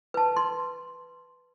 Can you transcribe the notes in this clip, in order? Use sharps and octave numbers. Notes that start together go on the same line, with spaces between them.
B4 A5
C6